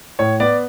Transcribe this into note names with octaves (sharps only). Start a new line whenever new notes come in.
A2 C#5
B3 D5